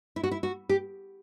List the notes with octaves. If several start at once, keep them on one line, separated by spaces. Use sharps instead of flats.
E4
F#4
E4
F#4
G4